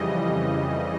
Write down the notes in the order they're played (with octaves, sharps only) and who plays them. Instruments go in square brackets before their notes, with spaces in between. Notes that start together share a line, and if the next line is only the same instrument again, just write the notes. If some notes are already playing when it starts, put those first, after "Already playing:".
Already playing: [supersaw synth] F2 C#3 E3 G3 D#5